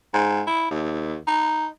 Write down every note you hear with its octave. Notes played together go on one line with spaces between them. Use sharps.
G#2
E4
D#2
D#4